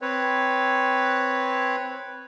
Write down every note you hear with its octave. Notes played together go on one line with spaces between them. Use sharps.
C4 B4 C#5